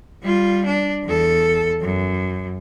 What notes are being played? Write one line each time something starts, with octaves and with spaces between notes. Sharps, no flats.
G3 F4
D4
E2 A4
F#2